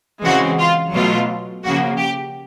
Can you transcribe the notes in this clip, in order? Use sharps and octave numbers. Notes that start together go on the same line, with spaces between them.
C#3 E3 G#3 C4 F#4
F4
B2 F#3 A3 F4
C#3 F3 A#3 F#4
G4